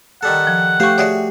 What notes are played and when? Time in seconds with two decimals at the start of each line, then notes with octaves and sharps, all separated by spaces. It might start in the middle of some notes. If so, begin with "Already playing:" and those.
0.23 D#3 G3 A4 F#5
0.47 F3
0.80 A3 G4 C5 F5 C#6
0.98 F#4 G#4 C#5 D5 E5